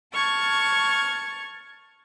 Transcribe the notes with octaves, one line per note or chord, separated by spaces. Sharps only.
A5 C#6 F6 G#6